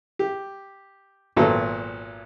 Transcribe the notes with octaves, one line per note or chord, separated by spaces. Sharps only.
G4
G#1 A#2 F#3 B3 A4 A#5